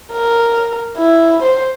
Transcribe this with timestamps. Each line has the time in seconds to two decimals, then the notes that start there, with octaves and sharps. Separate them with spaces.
0.12 A#4
0.97 E4
1.43 C5